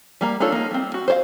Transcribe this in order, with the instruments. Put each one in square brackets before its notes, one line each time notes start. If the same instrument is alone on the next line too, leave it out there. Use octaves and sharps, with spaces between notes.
[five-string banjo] G3 A#3 A#5
D4 D#4 F4 A4 C#5
A#3 D#4
G3 C4
F#4
C5 C#5 F5